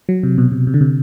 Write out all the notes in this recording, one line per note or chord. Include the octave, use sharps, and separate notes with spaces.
F#3
C3
B2
C3
C3
D3
C3